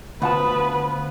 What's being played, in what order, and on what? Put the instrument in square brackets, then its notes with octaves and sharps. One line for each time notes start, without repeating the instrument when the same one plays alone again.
[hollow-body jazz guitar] D2 F#5 A5 [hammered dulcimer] F3 B3 [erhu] B4